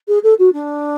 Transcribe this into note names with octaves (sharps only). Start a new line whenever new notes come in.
G#4
A4
F#4
D4